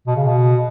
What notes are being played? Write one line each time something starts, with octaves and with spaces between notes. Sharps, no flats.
B2
C#3
B2